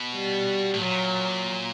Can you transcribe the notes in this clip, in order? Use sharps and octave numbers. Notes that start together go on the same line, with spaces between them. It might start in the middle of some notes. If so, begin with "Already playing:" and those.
Already playing: B2
G3
A2
A#2 F#3